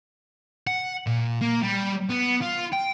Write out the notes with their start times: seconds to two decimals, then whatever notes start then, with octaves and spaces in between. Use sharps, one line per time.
0.67 F#5
1.07 A#2
1.42 A#3
1.63 G3
2.10 B3
2.42 F4
2.73 G5